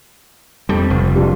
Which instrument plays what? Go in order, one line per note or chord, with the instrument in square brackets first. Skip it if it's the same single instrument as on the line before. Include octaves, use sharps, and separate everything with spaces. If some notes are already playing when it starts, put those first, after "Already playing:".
[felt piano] F2 [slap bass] G3
[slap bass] F1
[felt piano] G3 D4 F4